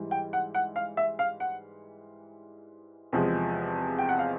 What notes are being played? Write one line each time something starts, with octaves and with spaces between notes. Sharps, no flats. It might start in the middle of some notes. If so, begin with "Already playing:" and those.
Already playing: G#2 E3 G3
G5
F#5
F#5
F5
E5
F5
F#5
E2 C3 F3 G#3
G5
F#5
F5